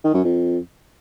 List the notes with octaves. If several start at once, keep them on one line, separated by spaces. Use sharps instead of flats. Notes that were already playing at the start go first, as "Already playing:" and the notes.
D#3
F#2
F2